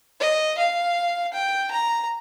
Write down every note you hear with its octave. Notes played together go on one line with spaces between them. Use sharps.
D#5
F5
G5
A#5